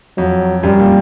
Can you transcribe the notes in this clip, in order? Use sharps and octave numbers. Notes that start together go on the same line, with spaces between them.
F2 F#3
F#2 G3
A#2